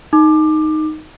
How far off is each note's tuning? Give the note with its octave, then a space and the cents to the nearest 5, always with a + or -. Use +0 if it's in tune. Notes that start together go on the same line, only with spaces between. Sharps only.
D#4 +0 D6 +20